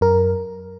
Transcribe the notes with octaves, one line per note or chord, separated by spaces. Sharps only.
F#2 A#4